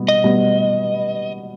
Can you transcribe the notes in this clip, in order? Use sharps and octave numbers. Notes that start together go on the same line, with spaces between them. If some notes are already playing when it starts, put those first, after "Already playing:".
Already playing: B2 G3 B3
D#5
B2 G3 B3